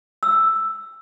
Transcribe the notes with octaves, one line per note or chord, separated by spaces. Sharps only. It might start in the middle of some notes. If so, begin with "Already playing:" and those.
E6